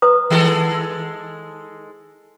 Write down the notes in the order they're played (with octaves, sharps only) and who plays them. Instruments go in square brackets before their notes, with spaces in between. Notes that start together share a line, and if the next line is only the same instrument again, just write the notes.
[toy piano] B4 A#5 D#6
[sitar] D#3 G#3 A4